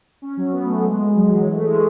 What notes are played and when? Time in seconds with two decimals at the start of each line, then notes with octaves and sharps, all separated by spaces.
0.22 C#4
0.37 F#3
0.53 B3
0.63 A3
0.74 B3
0.85 G#3
1.16 F#3
1.31 E3
1.51 A3
1.64 G#3